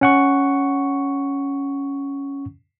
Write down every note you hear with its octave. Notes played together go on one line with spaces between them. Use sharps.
C#4 F#5 C#6